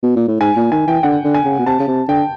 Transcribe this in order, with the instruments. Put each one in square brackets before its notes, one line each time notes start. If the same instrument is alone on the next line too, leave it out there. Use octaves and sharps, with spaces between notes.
[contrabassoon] B2
A#2
A2
[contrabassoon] G#2 [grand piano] G#5
[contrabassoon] A#2
[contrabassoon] D#3 [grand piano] G#5
[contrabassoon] E3 [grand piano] G5
[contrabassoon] D3 [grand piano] F#5
[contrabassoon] D3
[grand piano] G#5
[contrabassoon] C#3
B2
[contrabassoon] C3 [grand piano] A5
[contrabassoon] C#3
C3
[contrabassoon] D3 [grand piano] G5